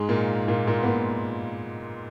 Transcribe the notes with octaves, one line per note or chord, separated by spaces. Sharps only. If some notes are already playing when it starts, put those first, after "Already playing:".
Already playing: G#2 G#3
A#2 A#3
A#2 A#3
A#2 A#3
B3
A#2 A#3